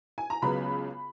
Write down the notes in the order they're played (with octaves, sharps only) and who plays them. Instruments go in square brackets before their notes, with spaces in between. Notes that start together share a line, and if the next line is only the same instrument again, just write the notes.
[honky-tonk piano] G#5
A#5
C#2 C#3 F#3 B3 B5